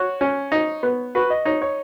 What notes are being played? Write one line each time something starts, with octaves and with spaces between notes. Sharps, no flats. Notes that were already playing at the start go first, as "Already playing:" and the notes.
Already playing: F#4 C#5
C#4
D#4
B3
F#4 B4
D#5
D#4 C#5
C#5